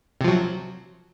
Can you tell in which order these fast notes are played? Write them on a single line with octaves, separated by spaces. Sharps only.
C3 F3 F#3